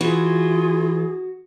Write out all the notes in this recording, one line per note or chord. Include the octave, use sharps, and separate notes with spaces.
E3 F4 F#4 G#4